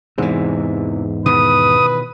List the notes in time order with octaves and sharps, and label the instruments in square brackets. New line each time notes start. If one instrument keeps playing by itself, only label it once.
[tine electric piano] E2 G#2 [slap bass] C3 E3
[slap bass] B2 D#3 E3 [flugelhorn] B4 [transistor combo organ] D#6